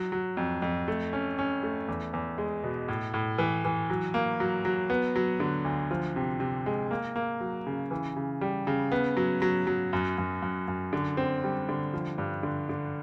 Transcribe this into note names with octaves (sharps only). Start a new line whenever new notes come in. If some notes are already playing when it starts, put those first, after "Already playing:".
Already playing: F#3
F#3
F2
F2
A3
C#4
C#4
A3
E2
E2
G#3
B2
A2
A2
E3
E3
F#3
A#3
F#3
F#3
B3
F#3
D3
D2
F3
C3
C3
G#3
A#3
A#3
F#3
C#3
E3
C#3
G3
C#3
B3
F#3
F#3
F#3
F#2
F#2
F#2
F#2
D3
C4
G3
D3
F3
G2
D3
D3